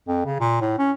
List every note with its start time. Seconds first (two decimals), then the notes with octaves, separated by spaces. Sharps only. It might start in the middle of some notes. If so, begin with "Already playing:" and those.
0.08 F2
0.25 C#3
0.40 A#2
0.61 A2
0.79 C#4